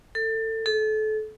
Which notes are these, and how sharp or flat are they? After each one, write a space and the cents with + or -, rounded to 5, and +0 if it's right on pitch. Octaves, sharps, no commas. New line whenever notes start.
A4 +25
A4 -30